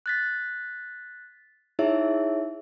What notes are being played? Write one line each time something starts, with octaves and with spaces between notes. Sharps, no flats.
F#6 A6 B6
D#4 E4 G#4 C#5 E5